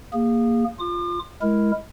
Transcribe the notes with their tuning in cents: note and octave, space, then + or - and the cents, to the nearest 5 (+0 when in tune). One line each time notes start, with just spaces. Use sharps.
A#3 +0 G#4 -25
F4 +0 D6 +45
G#3 +15 E4 +0 A#4 +0